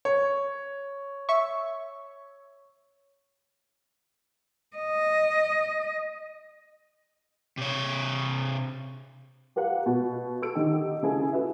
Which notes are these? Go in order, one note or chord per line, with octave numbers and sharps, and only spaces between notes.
C#5
E5 C#6
D#5
C3 C#5
G4 A#4 F5 F#5
B2
A4 E6 D7
D3 D#3 D#4 G4
C#3 E4 G#4 A4 G#5
E4 F#4 B4 E5